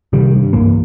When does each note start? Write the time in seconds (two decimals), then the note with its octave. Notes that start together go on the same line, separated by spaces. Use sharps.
0.13 C3 D#3 G3
0.36 G2
0.53 C#2 G2 E3 A#3